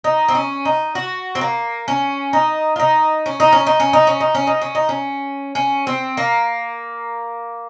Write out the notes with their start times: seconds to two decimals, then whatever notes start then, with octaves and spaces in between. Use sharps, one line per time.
0.04 D#4
0.28 C4
0.35 C#4
0.65 D#4
0.95 F#4
1.35 C4
1.41 A#3
1.88 C#4
2.33 D#4
2.76 F4
2.79 D#4
3.26 C#4
3.40 D#4
3.52 C#4
3.67 D#4
3.80 C#4
3.93 D#4
4.07 C#4
4.20 D#4
4.35 C#4
4.47 D#4
4.61 C#4
4.75 D#4
4.89 C#4
5.55 C#4
5.87 C4
6.17 A#3